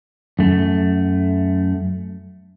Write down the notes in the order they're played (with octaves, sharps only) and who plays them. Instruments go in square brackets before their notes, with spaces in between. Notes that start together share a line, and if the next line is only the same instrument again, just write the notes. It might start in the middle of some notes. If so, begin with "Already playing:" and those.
[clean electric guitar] F#2 A3